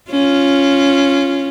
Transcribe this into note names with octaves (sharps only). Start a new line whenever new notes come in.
C#4 F4